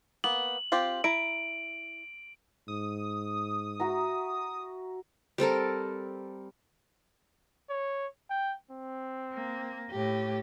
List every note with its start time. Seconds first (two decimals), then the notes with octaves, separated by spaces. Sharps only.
0.24 A#3 B3 F#7
0.72 C4 F4 G4
1.04 E4 A#5 D7
2.68 G#2 D#6
3.80 F#4 E5 A#5
5.38 G3 C4 A4 A#4
7.69 C#5
8.30 G5
8.71 C4
9.33 A#3
9.91 A2 G4